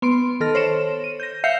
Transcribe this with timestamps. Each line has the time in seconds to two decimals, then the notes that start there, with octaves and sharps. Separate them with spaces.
0.02 B3 C6 D7
0.40 D#3 A4 F6 A#6
0.55 C5 C#5 E7
1.04 D#7
1.20 G6 A#6
1.44 E5 F5 G6 C7 C#7